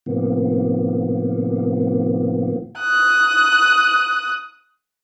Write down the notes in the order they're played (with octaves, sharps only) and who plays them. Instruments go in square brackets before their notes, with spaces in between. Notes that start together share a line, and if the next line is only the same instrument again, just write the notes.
[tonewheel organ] A2 C3 D#3 F3 A#3 B3
[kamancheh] D#6 F#6